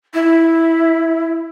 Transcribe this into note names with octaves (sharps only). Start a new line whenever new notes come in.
E4